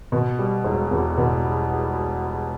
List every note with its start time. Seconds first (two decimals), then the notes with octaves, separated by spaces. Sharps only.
0.12 B2
0.39 G3
0.64 E1
0.91 E2
1.17 B2